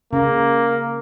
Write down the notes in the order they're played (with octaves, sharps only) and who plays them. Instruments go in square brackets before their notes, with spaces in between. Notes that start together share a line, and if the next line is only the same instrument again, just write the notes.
[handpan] C#3 [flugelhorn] A#3